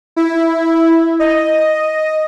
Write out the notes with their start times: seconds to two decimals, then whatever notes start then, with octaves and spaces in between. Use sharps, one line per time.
0.16 E4
1.20 D#5